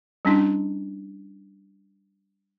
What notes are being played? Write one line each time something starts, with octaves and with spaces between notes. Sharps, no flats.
G3 C#4 D4 E4